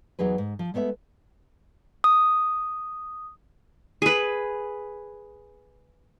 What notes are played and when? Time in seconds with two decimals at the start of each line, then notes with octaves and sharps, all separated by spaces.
0.19 E2 F#3 D#4 G#4 B4
0.38 G#2
0.59 F3
0.74 G#3 A3 B3 C#5 E5
2.04 D#6
4.02 G#4 B4